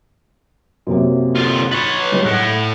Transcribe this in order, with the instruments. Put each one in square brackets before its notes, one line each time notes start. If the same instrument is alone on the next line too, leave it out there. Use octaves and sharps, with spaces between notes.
[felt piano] F#2 C3 A#3
[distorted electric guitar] D3 F4
[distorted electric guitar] B4 C#5 [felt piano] A6
[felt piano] C#2 G3
[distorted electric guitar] A2 [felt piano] F#5 F#6